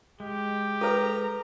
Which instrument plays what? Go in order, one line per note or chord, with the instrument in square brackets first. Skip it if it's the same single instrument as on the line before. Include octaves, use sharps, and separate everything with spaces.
[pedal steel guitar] G#3 [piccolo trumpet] G4
[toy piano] A4 B4 [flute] A#5